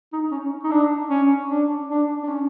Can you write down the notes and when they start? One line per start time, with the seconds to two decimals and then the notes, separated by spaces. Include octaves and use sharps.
0.13 D#4
0.31 C#4
0.64 D#4
0.72 D4
1.10 C#4
1.50 D4
1.90 D4
2.23 D4
2.29 C#4